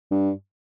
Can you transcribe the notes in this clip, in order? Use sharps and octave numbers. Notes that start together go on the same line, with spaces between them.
G2